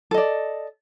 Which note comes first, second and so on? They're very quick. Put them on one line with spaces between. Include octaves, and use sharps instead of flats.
A4 D#5 D5